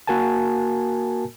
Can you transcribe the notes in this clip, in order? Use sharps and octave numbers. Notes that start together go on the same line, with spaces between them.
A#3 F#4 A#4 G#5 A5